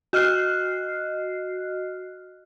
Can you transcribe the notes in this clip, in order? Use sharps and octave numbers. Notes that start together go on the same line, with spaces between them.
F#4 D#5 F6 F#6 C7